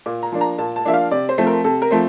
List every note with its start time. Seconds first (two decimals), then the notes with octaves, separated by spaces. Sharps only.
0.06 A#2 D6
0.23 A#5
0.32 F3 A#3 D4
0.41 A#5
0.58 A#2 A5
0.76 A5
0.85 F3 A#3 D4 E5
0.94 F5
1.11 C3 D5
1.29 C5
1.38 F3 A3 C4
1.47 A#4
1.64 C3 A4
1.82 A#4
1.91 F3 A3 C4